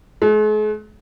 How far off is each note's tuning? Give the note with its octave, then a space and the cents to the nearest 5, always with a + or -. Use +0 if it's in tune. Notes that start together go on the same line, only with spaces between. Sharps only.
G#3 +45